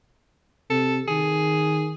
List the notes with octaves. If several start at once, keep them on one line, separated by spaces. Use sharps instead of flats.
C3 A4
D#3 G#4